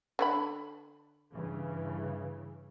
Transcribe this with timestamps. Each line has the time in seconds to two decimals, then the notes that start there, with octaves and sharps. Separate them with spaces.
0.19 D3 C#4 B5
1.33 G2 C#3 E3